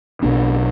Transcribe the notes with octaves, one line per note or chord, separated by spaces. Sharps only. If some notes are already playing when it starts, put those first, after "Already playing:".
B1 B2 B3 D4